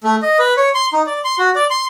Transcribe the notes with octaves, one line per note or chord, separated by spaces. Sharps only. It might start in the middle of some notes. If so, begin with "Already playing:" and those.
A3
D#5
B4
C#5
C6
D#4
D5
C6
F#4
D5
C6